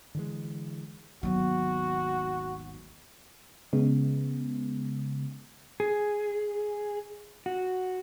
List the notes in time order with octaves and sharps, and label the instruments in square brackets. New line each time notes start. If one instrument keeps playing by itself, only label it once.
[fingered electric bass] D3 E3 G#3
[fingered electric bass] G#1 D#2 [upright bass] F#3 B3 [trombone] F#4
[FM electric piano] C#3 G#3 B3
[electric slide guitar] G#4
F#4